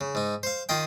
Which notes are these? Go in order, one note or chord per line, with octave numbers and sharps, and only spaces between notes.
C#3
G#2 D#4
C5 F5
D#3 F4 D#5 G5